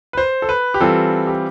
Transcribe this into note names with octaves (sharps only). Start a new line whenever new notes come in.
B4
C5
A4
B4
G4
E3 G3 C4 F4 A4
G4